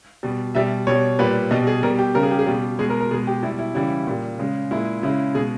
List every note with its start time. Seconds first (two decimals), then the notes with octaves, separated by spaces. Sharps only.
0.23 B2 G3
0.55 B2 G3 E5
0.87 B2 G3 C#5
1.19 A#2 G3 B4
1.51 B2 G3 D#5
1.67 G#4
1.83 B2 G3 A#4
1.99 G4
2.15 C#3 G3 A#4
2.23 G#4
2.31 G4
2.39 G#4
2.47 B2 G3 G4
2.79 B2 G#3 G#4
2.90 A#4
3.01 A#4
3.11 B2 G#3 G#4
3.27 G4
3.43 G3 E4
3.47 B2
3.59 E4
3.75 C#3 E3 G3 E4
4.07 A#2 G3
4.39 C#3 G#3
4.71 A#2 G#3 E4
5.03 C#3 G#3 E4
5.35 B2 G#3 G#4